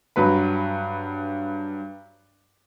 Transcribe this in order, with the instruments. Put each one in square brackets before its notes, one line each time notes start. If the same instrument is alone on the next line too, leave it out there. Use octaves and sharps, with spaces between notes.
[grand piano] G2 F#3 B4 B5